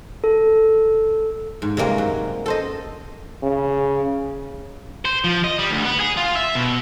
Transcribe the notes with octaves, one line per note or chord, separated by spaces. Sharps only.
A4
G#2
C3 G3 G#3 A#3 C4 C#4
F#2
A4 C5 D#5
C#3
C5
F3
D#5
G3
D2
B3
G#4
F4
E5
B2